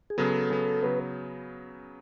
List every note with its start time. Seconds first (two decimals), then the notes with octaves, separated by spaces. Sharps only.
0.10 G#4
0.18 C#3 F#3 B3 A4
0.50 C#3 F#3 B3
0.82 C#3 F#3 B3 B4